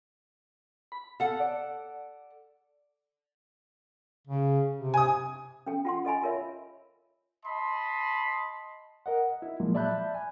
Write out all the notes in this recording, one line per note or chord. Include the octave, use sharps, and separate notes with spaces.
B5
A4 F5 F#5
D5
C#3
C3
G#5 D#6
C#4 A4 G5
F4 F#5 C6
A4 D#5 G#5 B5
F4 A#4 C#5 E5
D#5 A5 B5 C6
A#4 D#5 F#5
E4
A#2 F3 F#3 G#3 A#3
D5 E5 A5 B5 F#6 G6
G#5